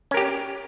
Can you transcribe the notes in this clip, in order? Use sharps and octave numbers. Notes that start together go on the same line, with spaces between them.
C#4 G4 A#4